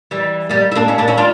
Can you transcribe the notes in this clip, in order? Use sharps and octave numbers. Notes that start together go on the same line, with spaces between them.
E3 G3
G3 A#3
E4
A#3 D4
C#4 E4
A#3 D4
C#4 E4
D4 F4